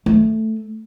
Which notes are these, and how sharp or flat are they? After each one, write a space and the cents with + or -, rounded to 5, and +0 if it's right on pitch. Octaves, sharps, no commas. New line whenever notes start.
A3 +0